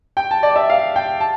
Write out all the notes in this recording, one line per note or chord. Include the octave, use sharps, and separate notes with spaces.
G5
A5
D5
E5
F5
G5
A5